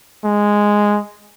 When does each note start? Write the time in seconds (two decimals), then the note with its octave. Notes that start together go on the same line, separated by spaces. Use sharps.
0.25 G#3